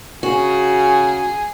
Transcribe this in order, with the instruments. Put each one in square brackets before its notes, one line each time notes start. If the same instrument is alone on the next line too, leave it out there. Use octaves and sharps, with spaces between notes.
[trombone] C#3 [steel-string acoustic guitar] F#4 [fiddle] G#4